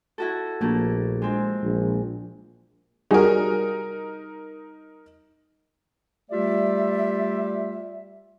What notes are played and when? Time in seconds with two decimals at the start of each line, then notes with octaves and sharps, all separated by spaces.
0.18 E4 F#4 A4
0.61 A#1 A3 A#3
1.22 G#3 C4
1.63 A#1
3.11 G3 D#4 F#4 G#4 A#4
6.31 G3 A3 F4 G4 D5 E5